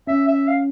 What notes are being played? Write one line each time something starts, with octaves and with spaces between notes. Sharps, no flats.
C#4 E5
E5
F5